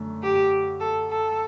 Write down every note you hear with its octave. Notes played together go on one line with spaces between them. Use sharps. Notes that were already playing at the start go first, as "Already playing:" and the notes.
Already playing: F#2 D3 A3
G4
A4
A4